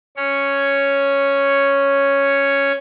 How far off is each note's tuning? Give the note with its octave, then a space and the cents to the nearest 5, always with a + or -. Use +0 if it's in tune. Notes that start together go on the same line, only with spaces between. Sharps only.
C#4 +0 C#5 +0